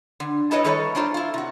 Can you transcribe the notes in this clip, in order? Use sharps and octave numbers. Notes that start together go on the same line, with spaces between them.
D3
D#4 E4 A4 B4 C#5 D#5
D#3 G3 A3 A4 B4 C#5
D4 D#4 F4 C5
E4 F4
C3 F#4